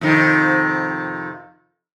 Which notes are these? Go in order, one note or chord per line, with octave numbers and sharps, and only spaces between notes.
F2 C3 D#3